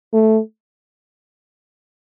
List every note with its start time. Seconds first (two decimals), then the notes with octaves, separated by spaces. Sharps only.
0.13 A3